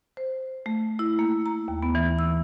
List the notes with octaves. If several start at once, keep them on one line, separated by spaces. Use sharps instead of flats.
C5
A3
E4
A#3
A#5
D#2
B3
E3
E6